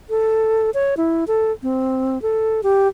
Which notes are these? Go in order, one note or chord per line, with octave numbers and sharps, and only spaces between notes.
A4
C#5
E4
A4
C4
A4
G4